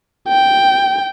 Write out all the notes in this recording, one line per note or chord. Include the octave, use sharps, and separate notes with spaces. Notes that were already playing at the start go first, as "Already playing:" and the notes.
G5